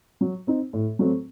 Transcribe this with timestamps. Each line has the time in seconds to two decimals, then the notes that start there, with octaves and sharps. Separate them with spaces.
0.21 F#3
0.47 C4 D#4
0.73 A2
0.99 F#3 A3 C4